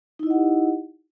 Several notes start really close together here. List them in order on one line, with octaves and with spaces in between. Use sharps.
D#4 E4 D#5 F#5 G4